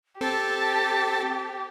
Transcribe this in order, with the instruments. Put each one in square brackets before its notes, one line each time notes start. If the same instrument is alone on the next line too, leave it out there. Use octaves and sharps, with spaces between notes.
[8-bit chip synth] C4 A4 [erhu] G4 [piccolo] A5